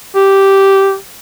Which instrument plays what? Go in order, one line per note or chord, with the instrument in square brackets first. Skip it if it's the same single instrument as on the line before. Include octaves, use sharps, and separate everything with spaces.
[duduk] G4